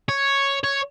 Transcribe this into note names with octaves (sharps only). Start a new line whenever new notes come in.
C#5
C#5